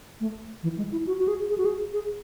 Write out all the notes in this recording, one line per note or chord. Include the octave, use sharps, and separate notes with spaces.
A3
E3
G#3
E4
F#4
F#4
G#4
G#4
F#4
G#4
G#4